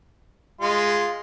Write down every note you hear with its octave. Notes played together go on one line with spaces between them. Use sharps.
G#3 F4